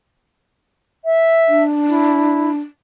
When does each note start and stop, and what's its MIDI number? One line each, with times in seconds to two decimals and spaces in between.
1.04 1.63 76
1.48 2.56 62
1.89 2.50 64